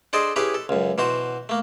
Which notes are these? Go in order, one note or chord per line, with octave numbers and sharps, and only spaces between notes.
D4 G#4 A4 C5 D5 D#5
C#4 E4 G4 G#4 B4
A4
C#2 F#2
B2 E3 F#4 C5
A3 A#3